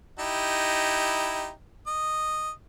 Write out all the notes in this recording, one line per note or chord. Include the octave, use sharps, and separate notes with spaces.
D#4 E4 G4
D#5